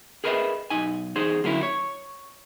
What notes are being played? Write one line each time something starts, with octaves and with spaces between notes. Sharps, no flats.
G#4 A#4 B4 D#5 E5
B1 D#4 G#5
E2 D#4 G#4 C5
D3 F#3 A#3 C#4 E4
C#5